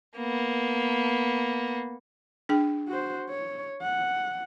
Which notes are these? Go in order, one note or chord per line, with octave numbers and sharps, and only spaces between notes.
A#3 B3
D4 G#4 G5
F#4 C5
C#5
F#5